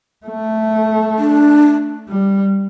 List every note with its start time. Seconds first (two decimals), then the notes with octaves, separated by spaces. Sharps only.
0.26 A3
1.18 D4
2.09 G3